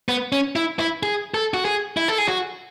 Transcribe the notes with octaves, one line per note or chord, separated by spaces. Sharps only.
B3
C#4
E4
E4
G#4
A4
F#4
G#4
E4
A4
G#4
F#4